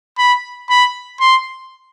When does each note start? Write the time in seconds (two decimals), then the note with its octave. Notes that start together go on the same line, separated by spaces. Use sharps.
0.18 B5
0.70 B5
1.20 C6